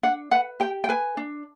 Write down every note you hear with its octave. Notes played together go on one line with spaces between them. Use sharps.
D4 F#5
B4 F#5
G4 G5
G5
B4 G#5
D4